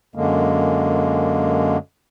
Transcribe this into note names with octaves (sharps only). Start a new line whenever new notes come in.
F#2 D3 G#3 A#3